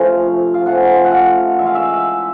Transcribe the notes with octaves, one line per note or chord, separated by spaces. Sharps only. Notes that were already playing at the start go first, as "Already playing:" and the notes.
Already playing: C3 F3 A3 C#4 F5
F5
C3 F3 A3 C#4 F#5
F#5
F5
E3 G#3 C#4 E5
F5
E5